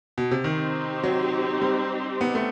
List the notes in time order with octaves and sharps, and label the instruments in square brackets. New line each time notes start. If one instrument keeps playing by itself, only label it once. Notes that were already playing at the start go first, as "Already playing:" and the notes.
[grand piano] B2
C3
[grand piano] D#3 [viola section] C4 D#4 G4 C5
[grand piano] F#3
G3
B3
A3